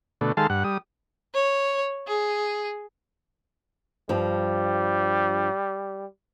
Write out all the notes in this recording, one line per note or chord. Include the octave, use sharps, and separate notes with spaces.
B2 D3 A3
D#3 G#3 A4 F5 A5 C6
G2 F#5
G3 D#6
C#5
G#4
G2 F3 G3